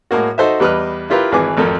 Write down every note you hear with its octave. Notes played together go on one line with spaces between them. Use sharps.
A2 G#3 A#3 F#4
D#4 F#4 A4 C5 D#5 E5
E2 G3 B4 D#5 F6
E4 F4 G4 A#4 B4
G#1 E3 G#4 B4 D6
G#1 F2 A4 A#4